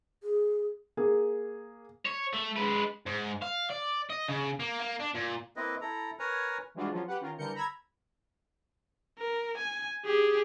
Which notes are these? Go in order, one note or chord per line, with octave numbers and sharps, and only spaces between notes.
G#4
A#3 G#4
C#5
A3
G#3 B4
G#2
F5
D5
D#5
C#3
A#3
A#3
D4
A#2
A#3 C4 E4 B4 D#5
E4 A4 A#5
A#4 B4 C#5 G#5 A#5
E3 G3 G#3 D4 F4 F#4
F3 F#3 C#4 F4
G4 B4 F#5
D#3 C#4 F4 A#4
D3 E3 G3 A#4 G6 C#7
A#5 B5 E6 G#6
A#4
G#5
G4 G#4